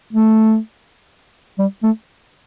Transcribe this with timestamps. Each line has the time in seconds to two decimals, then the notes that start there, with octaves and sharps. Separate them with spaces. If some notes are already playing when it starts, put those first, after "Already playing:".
0.13 A3
1.59 G3
1.83 A3